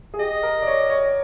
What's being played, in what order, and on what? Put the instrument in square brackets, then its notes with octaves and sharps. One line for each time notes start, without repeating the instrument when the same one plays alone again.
[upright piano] G#4
[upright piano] G4 [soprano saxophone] D#5
[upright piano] A#4
D5
C#5
C#5